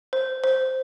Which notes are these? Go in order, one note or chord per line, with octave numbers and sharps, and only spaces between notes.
C5
C5